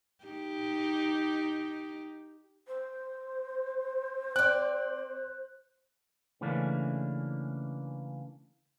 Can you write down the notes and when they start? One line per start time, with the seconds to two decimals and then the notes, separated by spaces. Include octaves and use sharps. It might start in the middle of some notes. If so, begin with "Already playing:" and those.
0.25 D#4 G4
2.67 C5
4.36 C4 D5 F#6
6.41 C#3 E3 A3 A#3 C#4 D4